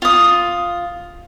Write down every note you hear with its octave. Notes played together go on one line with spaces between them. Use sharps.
F4 D#6